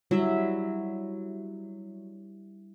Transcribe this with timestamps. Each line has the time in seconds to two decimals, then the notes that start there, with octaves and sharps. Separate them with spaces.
0.11 F#3 G3 E4 E5